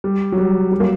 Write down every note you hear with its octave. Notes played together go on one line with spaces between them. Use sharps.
G3
F#3
G3
G3
F#3 A#3